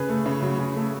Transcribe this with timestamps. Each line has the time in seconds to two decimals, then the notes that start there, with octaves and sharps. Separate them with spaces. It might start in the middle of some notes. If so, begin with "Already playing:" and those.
Already playing: C#3 G#4 B4
0.09 A3
0.26 C#3
0.42 F#3
0.59 C#3
0.76 A3